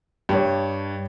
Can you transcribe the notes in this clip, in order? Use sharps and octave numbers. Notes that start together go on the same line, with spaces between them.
G2 G4 C#5